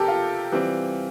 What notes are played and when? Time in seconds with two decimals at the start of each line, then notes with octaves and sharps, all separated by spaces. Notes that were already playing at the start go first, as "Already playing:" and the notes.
Already playing: C3 G4 A4 A#4
0.08 F4
0.52 E3 G3 C4